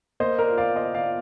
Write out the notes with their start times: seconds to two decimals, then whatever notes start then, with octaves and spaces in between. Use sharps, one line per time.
0.20 A#3 C5 D#5
0.38 A#4 D5
0.48 F4
0.58 D5 F5
0.75 F4 C5 D#5
0.94 D5 F5
1.04 F4